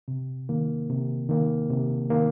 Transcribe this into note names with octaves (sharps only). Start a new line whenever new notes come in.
C3
D#3 A#3
C3
D#3 A#3
C3
D#3 A#3